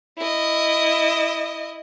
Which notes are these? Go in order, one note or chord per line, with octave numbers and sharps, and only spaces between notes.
E4 D#5